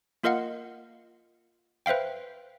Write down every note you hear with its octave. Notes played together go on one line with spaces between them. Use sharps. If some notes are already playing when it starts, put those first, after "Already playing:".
A#3 F4 A#4 D#5 F5 F#5
B4 C5 E5 F5 G5